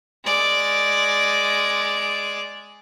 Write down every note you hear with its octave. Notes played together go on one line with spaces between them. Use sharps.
G#3 D5